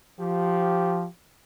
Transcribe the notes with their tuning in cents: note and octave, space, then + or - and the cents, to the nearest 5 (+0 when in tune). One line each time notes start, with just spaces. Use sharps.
F3 +0 G4 -15